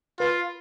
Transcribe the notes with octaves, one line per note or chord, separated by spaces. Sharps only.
F4 B4